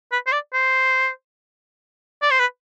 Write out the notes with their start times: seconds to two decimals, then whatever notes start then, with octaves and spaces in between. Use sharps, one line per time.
0.12 B4
0.27 C5
0.32 D5
0.53 C5
2.22 D5
2.31 C5
2.40 B4